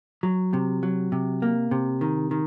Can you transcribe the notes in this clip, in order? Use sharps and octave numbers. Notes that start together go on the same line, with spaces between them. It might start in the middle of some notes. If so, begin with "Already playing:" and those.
F#3
C3
F#3
C3
A#3
C3
D#3
D#3